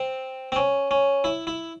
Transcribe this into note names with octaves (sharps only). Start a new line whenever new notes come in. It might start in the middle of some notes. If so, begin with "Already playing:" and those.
Already playing: C4
C4
C#4
C#4
E4
E4